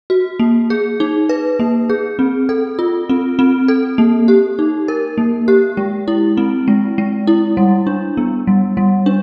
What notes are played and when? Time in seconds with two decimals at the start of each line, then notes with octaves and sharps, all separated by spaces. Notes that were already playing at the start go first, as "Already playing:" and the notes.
0.10 F#4
0.39 A#3
0.70 G#4
1.00 D#4
1.29 B4
1.59 A#3
1.90 G#4
2.19 C4
2.49 A4
2.79 F4
3.09 C4
3.39 C4
3.68 A4
3.98 A#3
4.28 G4
4.59 D#4
4.88 A#4
5.18 A#3
5.48 G4
5.77 G#3
6.08 E4
6.37 C4
6.68 G#3
6.98 G#3
7.27 E4
7.57 G3
7.87 D4
8.17 B3
8.47 G3
8.77 G3
9.06 D4